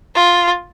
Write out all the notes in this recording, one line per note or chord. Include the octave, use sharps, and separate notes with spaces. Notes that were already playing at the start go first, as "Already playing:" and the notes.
F4